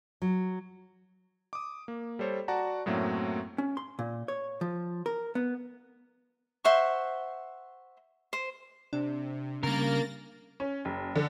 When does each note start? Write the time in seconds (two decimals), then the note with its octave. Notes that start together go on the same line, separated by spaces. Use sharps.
0.22 F#3
1.53 D6 D#6
1.88 A#3
2.19 G3 A4 C5 C#5
2.48 F#4 D5 F#5 A5 A#5
2.86 F#2 A2 F#3 A3 A#3 C4
3.58 C#4
3.77 C6
3.99 A#2
4.28 C#5
4.61 F3
5.06 A#4
5.35 B3
6.64 C5 E5 F#5 C#6
8.33 C5
8.93 C3 D4
9.63 C#3 G3 A#3 A#4 A6 A#6
10.60 C#4
10.85 F#1
11.16 D3